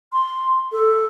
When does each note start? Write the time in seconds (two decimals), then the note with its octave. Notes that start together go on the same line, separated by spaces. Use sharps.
0.12 C6
0.72 A4